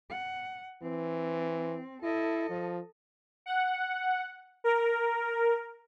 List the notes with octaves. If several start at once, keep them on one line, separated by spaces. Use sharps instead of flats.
F#5
E3 C4
E4 A4 D#5
F3
F#5
A#4